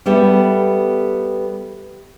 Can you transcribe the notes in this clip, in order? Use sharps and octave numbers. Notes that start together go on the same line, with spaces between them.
G3 B3 G4 A4 E5